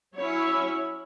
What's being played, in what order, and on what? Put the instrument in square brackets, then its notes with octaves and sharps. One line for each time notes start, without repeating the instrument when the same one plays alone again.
[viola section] F#3 C#4 E4 C#5